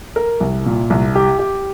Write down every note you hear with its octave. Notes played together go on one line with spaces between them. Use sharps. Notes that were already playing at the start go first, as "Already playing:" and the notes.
A#4
C2
A#2
C2
G4
G4